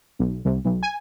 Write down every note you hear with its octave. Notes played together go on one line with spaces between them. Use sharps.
B1
C2
B1
G#5